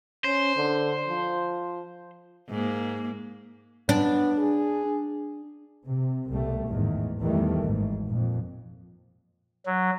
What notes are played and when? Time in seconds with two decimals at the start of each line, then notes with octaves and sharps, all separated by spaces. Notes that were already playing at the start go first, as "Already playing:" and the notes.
0.24 C#4 C5
0.56 D3
1.08 F3
2.50 G#2 A#3
3.89 B3 D4
4.37 G#4
5.88 C3
6.32 C2 B2 G3 A3
6.70 A1 E2 G#2 D#3
7.21 E2 D#3 E3 G3 A3
7.64 G#1 G#2
8.07 F2 A#2
9.66 F#3